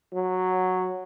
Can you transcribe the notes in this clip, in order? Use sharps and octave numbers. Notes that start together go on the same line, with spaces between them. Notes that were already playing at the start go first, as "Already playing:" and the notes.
F#3